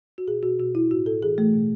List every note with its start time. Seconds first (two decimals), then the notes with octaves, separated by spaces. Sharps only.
0.18 F#4
0.28 B2 G#4
0.43 B2 F#4
0.59 B2 F#4
0.75 B2 E4
0.91 A2 F#4
1.06 A2 A4
1.23 E3 G#4
1.38 E3 A3
1.54 B2